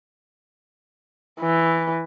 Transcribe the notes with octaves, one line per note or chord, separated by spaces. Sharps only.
E3